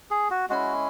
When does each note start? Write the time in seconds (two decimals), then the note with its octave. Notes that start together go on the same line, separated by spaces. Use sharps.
0.11 G#4
0.30 F#4
0.50 G#3 C#4 E4 F#4